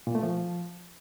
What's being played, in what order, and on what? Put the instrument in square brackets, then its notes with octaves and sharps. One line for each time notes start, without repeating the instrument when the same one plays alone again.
[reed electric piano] A#2
A3
F3